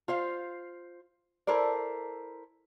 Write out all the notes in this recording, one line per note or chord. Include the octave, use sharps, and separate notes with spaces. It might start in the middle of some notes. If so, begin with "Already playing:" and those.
F4 C5 F5
E4 A4 A#4 C5 D5